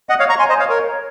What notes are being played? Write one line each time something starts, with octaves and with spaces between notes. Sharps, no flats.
D#5 F#5
C#5 F5
A#5 C#6
G#5 C6
C5 D#5
C#5 F5
A#4 C#5